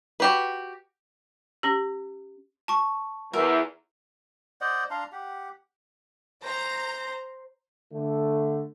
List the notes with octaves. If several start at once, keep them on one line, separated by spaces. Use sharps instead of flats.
F#4 G4 B4
C#4 G4
A5 C#6
E2 A#4 E5
C5 D5 D#5 F#5
D4 F5 A#5 C6
G4 F#5
C5 A#5
D3 A3